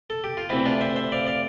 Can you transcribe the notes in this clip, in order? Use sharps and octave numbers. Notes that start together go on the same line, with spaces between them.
A4
G4
F4
D2 C3 E3 C4 E4
D4 F4
C5 E5
C5 E5
D5 F5
D5 F5